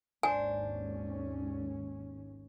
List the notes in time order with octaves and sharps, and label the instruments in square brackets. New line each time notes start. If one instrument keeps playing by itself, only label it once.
[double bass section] G#1 D#2 C#4 [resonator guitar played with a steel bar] D4 C5 [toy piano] G#5